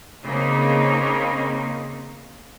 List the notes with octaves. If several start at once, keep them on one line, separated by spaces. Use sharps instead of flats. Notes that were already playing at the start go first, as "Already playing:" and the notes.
C#3 A#3 C4 D#4